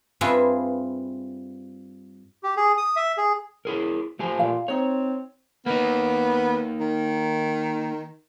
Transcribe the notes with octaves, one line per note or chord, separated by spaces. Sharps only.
G2 C4 F4 G#4 B4 E5
G4
G#4
D#6
E5
G#4
E4 G#4 A#4
F3 A3 G4 G#5
A#2 F5
C4 D#4 C5 C#5
A#3 B3 D#4
D#3